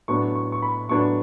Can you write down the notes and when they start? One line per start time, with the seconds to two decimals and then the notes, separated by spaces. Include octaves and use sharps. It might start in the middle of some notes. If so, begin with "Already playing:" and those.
0.08 A2 F#3 B3 D4 C#6
0.35 C#6
0.52 C#6
0.62 B5
0.89 A2 F#3 B3 D4 C#6